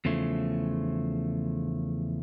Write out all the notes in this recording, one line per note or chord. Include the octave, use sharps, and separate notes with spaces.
E2 C#3 F3 A3